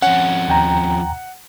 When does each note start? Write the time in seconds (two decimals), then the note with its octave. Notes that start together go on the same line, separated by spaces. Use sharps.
0.02 F2 C#4 F#5
0.48 D#2 G5 A#5